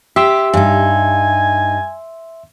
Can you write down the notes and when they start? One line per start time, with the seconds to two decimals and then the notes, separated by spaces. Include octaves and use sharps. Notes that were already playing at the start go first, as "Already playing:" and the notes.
0.16 G4 E5 C6 E6
0.54 G2 D#4 G#5